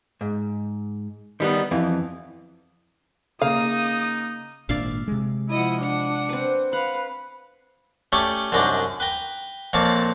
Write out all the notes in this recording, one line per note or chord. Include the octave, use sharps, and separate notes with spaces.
G#2
D#3 G3 B3
F2 E3
C#3 A#3 D#4 F5 D#6
G#1 A#2 D4 D5 E5 F5
C3 G#3
F3 E4 D#5 F#5
D4 F#5
C4 B4
B4 F5 F#5
A3 C#4 G4 D5 G#5
C2 F#2 D4 D#4 D5
B4 G5 A#5
F2 A#2 C#5 D5 F5 A5